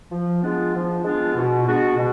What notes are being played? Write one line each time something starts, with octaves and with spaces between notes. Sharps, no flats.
F3
G#3 B3 D4 F4
F3
G#3 B3 D4 F4
B2
G#3 B3 D4 F#4
B2